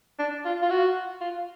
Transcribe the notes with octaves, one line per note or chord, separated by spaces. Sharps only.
D4
F4
F4
F#4
F4